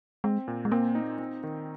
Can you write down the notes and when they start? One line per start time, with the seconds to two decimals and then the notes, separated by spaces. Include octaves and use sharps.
0.24 G#3 C4
0.48 A#2
0.65 G#3
0.71 A#3 C4
0.95 D#4
1.19 C4
1.43 D#3